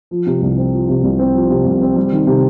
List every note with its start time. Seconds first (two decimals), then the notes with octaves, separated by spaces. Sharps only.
0.11 F3
0.26 C3
0.42 C2
0.57 C4
0.73 F3
0.89 C3
1.03 C2
1.19 C4
1.34 F3
1.50 C3
1.65 C2
1.81 C4
1.96 G3
2.12 D#3
2.27 C3